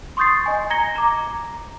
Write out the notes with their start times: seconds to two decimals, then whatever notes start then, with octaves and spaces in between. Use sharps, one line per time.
0.17 C6 C#6 D#6 G6 A6 C7
0.46 D#5 G#5
0.70 A#5 G#6 A#6 C#7 G7
0.96 A#5 D6